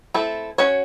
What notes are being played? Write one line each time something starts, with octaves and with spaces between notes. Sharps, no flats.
A3 C4 E4 A4
C#4 F#4 C#5